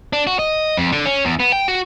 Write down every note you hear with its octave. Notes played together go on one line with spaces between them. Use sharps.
D4
F#4
D#5
F2
D3
C#4
E2
B3
G5
F#4